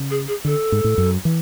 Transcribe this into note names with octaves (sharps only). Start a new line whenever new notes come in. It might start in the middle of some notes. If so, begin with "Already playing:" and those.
Already playing: C#3
G#4
G#4
D3 A4
G#2
A2
F#2
E3